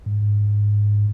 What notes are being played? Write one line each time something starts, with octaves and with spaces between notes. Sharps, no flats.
G#2